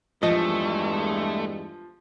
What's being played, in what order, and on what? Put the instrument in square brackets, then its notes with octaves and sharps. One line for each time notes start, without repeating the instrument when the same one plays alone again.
[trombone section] E2 G2 G#3 [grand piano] F3 [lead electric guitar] A3 [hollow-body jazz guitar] D#5